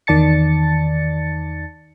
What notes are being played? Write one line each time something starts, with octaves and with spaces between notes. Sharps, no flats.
E2 D#3 D5 A5 A6 C#7